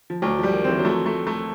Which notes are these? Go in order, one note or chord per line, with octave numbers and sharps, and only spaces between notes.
F3
D2 F#3
F3
G3
D#3
E3 C4
F#3
F3 A3
A3
A3